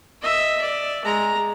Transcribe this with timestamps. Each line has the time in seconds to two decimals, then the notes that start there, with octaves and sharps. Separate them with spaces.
0.22 D#5 E5
0.61 D5
1.05 G#3 A#5